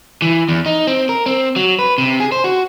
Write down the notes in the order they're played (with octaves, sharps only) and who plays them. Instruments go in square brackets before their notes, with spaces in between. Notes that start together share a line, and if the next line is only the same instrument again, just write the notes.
[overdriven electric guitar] E3
E2
D#4
C4
A#4
C4
F#3
B4
C3
G#4
C5
F#4